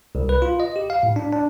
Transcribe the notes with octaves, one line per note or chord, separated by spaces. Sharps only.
C2
B4
F4
D#5
G4
F5
A2
D4
D4